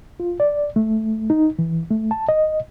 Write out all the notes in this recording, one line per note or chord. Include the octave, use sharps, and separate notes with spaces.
F4
D5
A3
D#4
E3
A3
A5
D#5